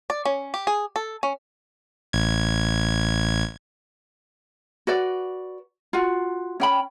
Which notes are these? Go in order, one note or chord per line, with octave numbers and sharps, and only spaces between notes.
D5
C#4
G4
G#4
A4
C#4
A1 G#6
F#4 B4 D5
F4 F#4
C#4 G5 B5